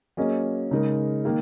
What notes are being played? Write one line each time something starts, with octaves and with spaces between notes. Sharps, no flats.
F#3 A#3 C#4 G#4 D#5
C#3 G#3 D#4 A#4
D#3 A#3 D#4